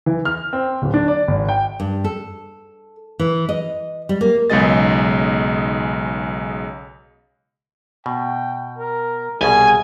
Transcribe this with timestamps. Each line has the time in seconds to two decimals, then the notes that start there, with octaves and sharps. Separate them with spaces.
0.06 E3
0.25 F6
0.53 C4
0.82 D1
0.94 D4
1.08 D5
1.28 G#1
1.49 G5
1.80 G2
2.04 A4
3.19 E3
3.49 D#5
4.09 G3
4.21 A#3
4.50 B1 C#3 G#3 G#4 D#5 A6
8.06 B2 G5
8.78 A#4
9.41 C2 B2 G#4 G#5